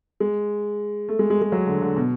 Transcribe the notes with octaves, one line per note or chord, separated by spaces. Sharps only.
G#3
A3
G#3
G#3
G#3
F#3
D3
D3
B2